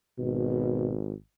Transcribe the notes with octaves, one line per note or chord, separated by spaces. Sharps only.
G#1 B2